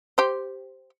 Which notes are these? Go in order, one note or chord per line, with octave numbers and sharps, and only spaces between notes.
G4 C5